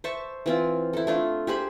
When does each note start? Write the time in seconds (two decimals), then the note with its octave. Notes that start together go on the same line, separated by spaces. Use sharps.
0.04 C5 E5 A5 C#6
0.46 E3 C4 F4
0.93 E4 A4
1.07 A3 D4 F4
1.47 G4 G#4 C5 B5